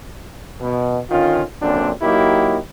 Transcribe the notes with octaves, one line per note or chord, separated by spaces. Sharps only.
B2
D3 D#3 C#4 F4
A#1 F#2 A#2 D3 C4 D4
F#3 A#3 D#4 E4 G4